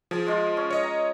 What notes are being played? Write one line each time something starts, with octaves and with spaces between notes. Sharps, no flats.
F3 G#4
G#3 F4 D#5
C#4
C#5 D#5
A#5